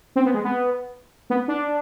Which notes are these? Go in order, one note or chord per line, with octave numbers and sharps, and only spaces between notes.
C4
B3
G#3
B3
B3
D4